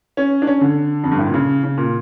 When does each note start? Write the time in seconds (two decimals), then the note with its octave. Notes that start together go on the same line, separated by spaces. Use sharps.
0.17 C#4
0.42 D4
0.47 C#4
0.61 D3
1.04 F2
1.11 G2
1.19 A2
1.26 A#2
1.34 C#3
1.64 C#3
1.77 A#2